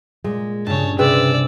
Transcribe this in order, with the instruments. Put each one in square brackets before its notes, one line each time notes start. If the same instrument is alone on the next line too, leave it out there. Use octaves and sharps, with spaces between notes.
[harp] A#2 [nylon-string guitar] G#3
[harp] G2 C#3 [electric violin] C#5 A5
[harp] C3 [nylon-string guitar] G#4 B4 G5 [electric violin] D5 E6